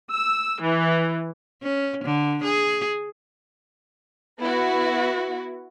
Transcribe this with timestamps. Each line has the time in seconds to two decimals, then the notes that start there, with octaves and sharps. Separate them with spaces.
0.11 E6
0.62 E3
1.63 C#4
2.05 D3
2.44 G#4
4.39 B3 E4 F#4